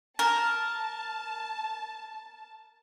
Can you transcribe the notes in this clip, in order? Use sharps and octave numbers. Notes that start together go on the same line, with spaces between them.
A#4 A5